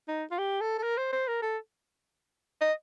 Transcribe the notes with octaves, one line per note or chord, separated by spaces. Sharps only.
D#4
F4
G4
A4
A4
A#4
C5
C5
A#4
A4
D#5